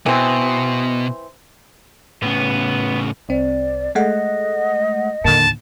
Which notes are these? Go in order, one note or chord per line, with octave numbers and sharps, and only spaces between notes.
B2 E3 C4
A2 C#3 B3
C2 C4 D5
G#3 A3 D#5 F#5
D#2 A2 D3 A#3 A5